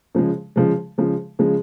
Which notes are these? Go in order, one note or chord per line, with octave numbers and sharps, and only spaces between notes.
C#3 F3 G#3
C#3 F3 G#3
C#3 F3 G#3
C#3 F3 G#3